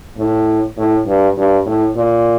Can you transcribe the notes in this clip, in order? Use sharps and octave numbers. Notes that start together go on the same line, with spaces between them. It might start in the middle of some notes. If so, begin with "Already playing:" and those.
A2
A2
G2
G2
A2
A#2